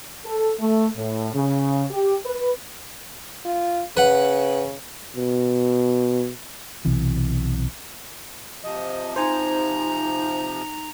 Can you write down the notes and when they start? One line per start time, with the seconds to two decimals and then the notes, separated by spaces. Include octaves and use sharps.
0.25 A4
0.59 A3
0.96 A2
1.34 C#3
1.90 G4
2.24 B4
3.45 F4
3.97 C#3 B4 F#5
5.17 B2
6.85 B1 C3 E3
8.63 C3 F3 D#5
9.16 D#4 C5 G#5 A#5